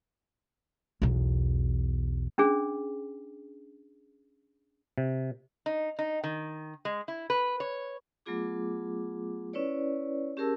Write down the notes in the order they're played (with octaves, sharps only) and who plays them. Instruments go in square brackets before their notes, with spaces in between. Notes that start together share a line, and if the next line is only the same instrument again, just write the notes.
[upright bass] B1 E2
[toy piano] C#4 D4 G#4
[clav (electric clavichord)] C3
[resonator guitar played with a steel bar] D#4
D#4
D#3
G#3
E4
B4
C#5
[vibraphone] F#3 A3 B3 F4 G#4 D6
C#4 E4 B4 C#5 D5
C#4 G4 G#4 A#4 A5 E6